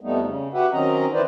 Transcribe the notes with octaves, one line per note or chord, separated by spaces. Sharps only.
F2 G3 A3 B3 D#4
C#3
F#4 G4 B4 E5 F#5
D#3 F#3 C4 C#4 D#5 A#5
D#3 E3 E4 B4 C5 D5